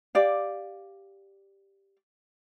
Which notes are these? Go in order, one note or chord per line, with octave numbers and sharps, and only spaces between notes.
G4 D5 F5